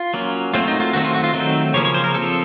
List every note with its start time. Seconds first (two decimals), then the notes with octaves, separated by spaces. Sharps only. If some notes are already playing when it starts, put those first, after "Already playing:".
Already playing: F4
0.14 F#3 A#3 C#4
0.54 F#3 A3 C4 F4
0.68 D#4
0.80 F4
0.93 D#3 A3 C4 F#4
1.04 F4
1.14 F#4
1.24 F4
1.34 D#3 F#3 A3 C4 D#4
1.74 C#3 F3 A#3 C#4 C#5
1.85 C#5
1.94 C5
2.04 A#4
2.14 F3 C4 A4